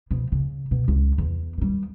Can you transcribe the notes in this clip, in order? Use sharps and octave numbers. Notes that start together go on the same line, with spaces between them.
B2 F3
C#3
B2
C#2
E2
D#3 G3